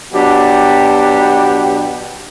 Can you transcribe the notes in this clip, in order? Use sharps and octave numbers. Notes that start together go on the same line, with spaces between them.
B2 F#3 D4 G4